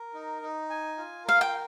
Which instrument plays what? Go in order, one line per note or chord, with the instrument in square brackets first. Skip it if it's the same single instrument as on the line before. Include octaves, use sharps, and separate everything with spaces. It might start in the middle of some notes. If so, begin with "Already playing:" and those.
Already playing: [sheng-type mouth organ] A#4
D#4
D#4
G#5
F4
[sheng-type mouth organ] A#4 [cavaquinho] F5
[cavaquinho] G5